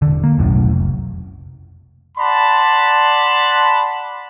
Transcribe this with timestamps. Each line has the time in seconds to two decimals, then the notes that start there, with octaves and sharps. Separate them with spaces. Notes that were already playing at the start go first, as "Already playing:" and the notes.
0.02 E1 D3
0.24 A#3
0.38 E1 B1 F#2 A2
0.70 F1
2.18 D5 F#5 A5 B5 C6